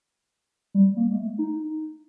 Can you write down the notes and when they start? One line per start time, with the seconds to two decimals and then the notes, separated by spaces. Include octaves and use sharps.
0.74 G3
0.97 A#3
1.11 G#3
1.18 A3
1.39 D#4